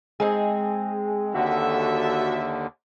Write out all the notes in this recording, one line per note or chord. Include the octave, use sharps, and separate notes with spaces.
G#3 C4 D#4 G#4
D#2 D3 F#4 A4 E5